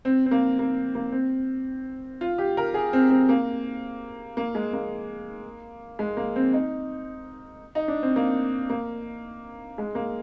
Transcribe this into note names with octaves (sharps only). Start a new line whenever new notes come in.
C4
C4
A#3
A#3
A#3
C4
F4
G4
A#4
G#4
C4
C4
A#3
A#3
G#3
A#3
G#3
A#3
C4
D#4
D#4
D4
C4
A#3
A#3
G#3
A#3